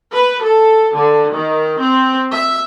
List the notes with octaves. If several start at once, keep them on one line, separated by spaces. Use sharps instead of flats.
B4
A4
D3
D#3
C4
E5